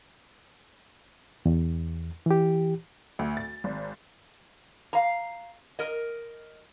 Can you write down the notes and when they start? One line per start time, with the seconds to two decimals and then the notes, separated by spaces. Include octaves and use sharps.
1.46 E2
2.26 E3 G4
3.19 D2
3.37 A6
3.64 G#1
4.93 F5 A#5
5.79 A#4 D#5